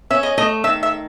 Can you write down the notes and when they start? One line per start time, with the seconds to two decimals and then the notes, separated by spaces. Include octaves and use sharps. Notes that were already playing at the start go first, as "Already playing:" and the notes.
0.11 C#4 E5
0.23 D#5
0.38 A3 D#5
0.64 D#3 E5
0.83 E5